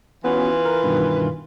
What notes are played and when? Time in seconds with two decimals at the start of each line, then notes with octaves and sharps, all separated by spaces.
0.24 E3 B3 C#4 F4 F#4 B4
0.65 A#4
0.83 G2 B2 D#3